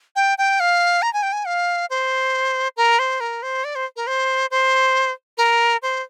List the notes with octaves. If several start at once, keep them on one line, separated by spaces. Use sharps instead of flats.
G5
G5
F5
A#5
G#5
G5
G#5
F5
C5
A#4
C5
A#4
C5
D5
C5
A#4
C5
C5
A#4
C5